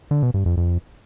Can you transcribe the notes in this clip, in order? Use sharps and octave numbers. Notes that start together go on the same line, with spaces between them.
D3
B2
G2
F2
F2